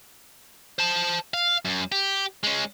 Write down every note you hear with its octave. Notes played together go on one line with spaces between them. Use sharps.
C5 A5
F5
F#2
G4
G#3 C#4